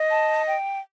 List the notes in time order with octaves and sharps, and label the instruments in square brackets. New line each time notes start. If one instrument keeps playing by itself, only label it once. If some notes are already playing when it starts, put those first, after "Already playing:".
Already playing: [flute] D#5
[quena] A5
G5